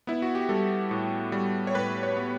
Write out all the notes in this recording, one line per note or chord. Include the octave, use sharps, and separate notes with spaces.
B3 E4
F#4
G4
G3 A4
A2
G3
C#5
A2 B4
C#5
B3